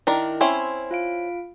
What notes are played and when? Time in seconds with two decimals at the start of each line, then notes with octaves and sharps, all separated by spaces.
0.07 D#3 D4 E4 A#4
0.41 C4 C#4 E4 C6
0.91 F4 F5 D7